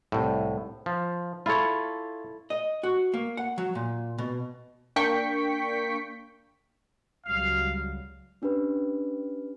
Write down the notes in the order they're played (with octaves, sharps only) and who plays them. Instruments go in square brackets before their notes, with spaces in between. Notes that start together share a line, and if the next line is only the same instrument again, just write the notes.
[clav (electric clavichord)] C2 A2
F3
[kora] E4 A4 [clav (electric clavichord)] F4 C#5
[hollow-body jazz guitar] D#5
F#4
A#3
F#5
F#3
A#2
B2
[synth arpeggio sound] A#3 D4 G5 C#6 B6 C#7
[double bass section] C#2 F#3 G3 [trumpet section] F5
[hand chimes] C#4 D4 G4 B4